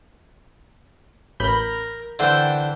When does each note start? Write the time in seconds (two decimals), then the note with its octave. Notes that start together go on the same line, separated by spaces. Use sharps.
1.40 A1 A#4 B5 G6
2.19 D3 E3 A4 C5 G5